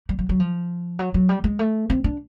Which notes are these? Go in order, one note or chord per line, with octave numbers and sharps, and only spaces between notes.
G3
F#3
F#3
F3
F#3
F#3
G3
G#3
A3
C4
D4